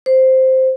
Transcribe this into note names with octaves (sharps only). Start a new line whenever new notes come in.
C5